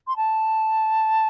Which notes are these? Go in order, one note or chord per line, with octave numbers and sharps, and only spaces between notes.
C6
A5